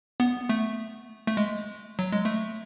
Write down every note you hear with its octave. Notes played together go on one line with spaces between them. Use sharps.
B3
A3
A3
G#3
F#3
G#3
A3